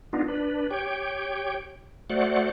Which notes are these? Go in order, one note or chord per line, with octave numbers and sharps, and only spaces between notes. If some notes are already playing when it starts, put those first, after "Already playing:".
B3 D4 D#4 F4
D4 B4
G4 C#5 G5
A3 F#4 C5 D5 F#5